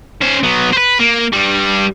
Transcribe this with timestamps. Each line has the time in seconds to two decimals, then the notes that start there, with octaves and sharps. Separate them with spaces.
0.22 C#4 C5
0.43 F#3 B3
0.73 B4 C5
0.99 A#3
1.33 G2 G3